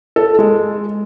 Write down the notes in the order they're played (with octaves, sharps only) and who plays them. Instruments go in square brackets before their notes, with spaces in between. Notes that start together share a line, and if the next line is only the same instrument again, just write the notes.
[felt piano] A4
G#3